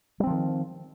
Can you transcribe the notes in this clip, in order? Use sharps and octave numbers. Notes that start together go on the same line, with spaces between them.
D#3 F3 G3 C4